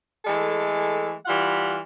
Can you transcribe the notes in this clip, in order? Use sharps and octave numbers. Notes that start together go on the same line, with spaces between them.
E3 G#3 A3 A4
E3 G3 F4 F#5